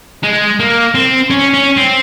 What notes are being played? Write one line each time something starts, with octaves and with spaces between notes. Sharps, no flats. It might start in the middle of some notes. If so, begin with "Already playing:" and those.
G#3
A#3
C4
C#4
C#4
C4